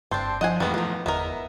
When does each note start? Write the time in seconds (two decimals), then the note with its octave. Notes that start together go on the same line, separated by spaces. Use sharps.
0.11 F#1 G2 C4 D4 A5 C6 G6
0.41 F3 D4 C5 D#5 F#5 G#5
0.60 B1 F2 G#2 E3 G3 A3 B3
0.74 F3 B3 A#4
1.06 G1 E2 B3 A#4 D#5 E5